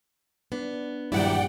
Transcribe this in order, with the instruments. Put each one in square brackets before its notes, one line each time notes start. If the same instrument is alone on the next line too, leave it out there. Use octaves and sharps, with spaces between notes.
[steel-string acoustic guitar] B3 [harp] D4
[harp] A#1 G2 [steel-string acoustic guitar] D#3 F#3 E4 [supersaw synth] D5 F#5 G5